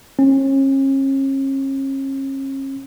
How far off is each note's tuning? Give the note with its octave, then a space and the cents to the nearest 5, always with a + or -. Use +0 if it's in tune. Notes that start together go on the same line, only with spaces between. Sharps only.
C#4 -40